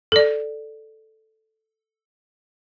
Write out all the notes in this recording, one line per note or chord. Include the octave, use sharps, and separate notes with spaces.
A4 D5